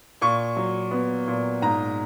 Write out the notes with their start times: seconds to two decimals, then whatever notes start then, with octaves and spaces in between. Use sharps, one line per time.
0.22 A#2 C#6
0.57 F#3
0.91 B3
1.27 A#2
1.62 G#2 A#5